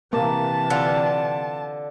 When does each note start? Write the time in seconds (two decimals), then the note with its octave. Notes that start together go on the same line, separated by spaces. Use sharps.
0.13 C3 E3 A#3 A5
0.70 D3 F4